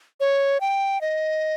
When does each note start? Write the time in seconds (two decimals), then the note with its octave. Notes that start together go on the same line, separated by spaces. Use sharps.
0.20 C#5
0.61 G5
1.01 D#5